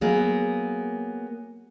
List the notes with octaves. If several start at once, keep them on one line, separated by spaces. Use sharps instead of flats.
F#3 A#3 B3 G#4